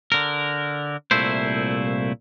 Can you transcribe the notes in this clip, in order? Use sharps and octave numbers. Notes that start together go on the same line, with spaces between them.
D3 A#4
C2 A#2 A3 E4 C5